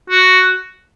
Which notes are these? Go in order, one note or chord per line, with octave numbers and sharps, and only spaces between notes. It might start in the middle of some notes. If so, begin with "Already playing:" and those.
F#4